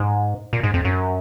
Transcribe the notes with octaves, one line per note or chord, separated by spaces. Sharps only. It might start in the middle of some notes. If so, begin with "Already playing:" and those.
Already playing: G#2
A#2
G#2
F2
F#2